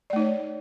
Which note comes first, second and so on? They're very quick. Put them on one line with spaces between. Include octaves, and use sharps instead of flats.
D5 A3 D#4 C#5